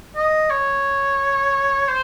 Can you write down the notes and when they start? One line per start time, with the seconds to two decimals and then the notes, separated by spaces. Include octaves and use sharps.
0.16 D#5
0.51 C#5
1.88 C5